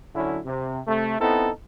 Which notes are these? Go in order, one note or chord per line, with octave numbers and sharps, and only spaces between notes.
D3 F#3 C#4 E4
C3
C3 A3
B3 C4 D#4 E4 A4